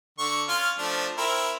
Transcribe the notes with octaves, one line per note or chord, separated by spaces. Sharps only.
D3 C#6
C#4 F4 F6
F3 A3 D4
C4 E4 A#4